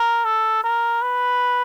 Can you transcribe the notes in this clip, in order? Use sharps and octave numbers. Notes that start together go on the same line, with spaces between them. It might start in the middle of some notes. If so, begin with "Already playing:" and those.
Already playing: A#4
A4
A#4
B4